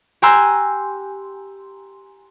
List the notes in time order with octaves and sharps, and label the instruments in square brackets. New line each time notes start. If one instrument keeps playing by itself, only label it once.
[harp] G4 G#5 A#5 C6 E6 F#6